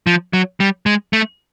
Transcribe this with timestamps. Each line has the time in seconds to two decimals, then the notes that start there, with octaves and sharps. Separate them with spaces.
0.07 F3
0.33 F#3
0.60 G3
0.86 G#3
1.13 A3